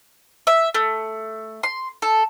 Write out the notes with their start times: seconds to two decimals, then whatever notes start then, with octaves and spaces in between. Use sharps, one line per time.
0.47 E5
0.75 A3
1.63 C6
2.02 A4